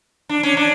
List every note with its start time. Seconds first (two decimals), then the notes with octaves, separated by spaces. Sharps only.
0.29 D4
0.43 C#4
0.57 D4